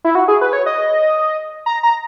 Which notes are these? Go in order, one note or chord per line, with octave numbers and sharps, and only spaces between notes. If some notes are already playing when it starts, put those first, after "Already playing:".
E4
F#4
G#4
B4
C#5
D#5
A#5
A#5